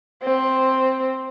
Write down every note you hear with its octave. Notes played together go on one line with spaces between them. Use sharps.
C4